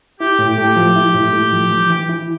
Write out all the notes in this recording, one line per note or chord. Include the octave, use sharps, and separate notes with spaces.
E4 G4 G5
A2
A3 G4 G5
F3
E4
A2
A3
F3
E3
E3
E4